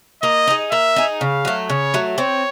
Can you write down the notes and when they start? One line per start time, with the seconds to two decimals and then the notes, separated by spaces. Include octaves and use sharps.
0.23 A#3 D#5
0.47 D#4 G#4
0.71 A#3 E5
0.96 D#4 G#4
1.21 C#3 F5
1.45 F#3 A3
1.70 C#3 C#5
1.94 F#3 A3
2.18 C4 C#5